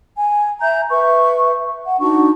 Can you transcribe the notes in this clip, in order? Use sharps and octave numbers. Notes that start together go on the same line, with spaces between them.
G#5
E5 A#5 G6
B4 E5 C#6
F#5
D4 D#4 F#4 C#6